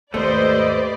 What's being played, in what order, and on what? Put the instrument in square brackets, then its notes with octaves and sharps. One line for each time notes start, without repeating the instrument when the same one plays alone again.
[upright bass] D#2 G#2 [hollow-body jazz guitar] A3 [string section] G4 B4 D5 [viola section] C5 D#5